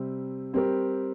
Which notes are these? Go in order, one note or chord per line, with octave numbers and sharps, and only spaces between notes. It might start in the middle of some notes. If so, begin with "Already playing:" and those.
Already playing: C3 G3 C4 G4
G3 C4 G4 A#4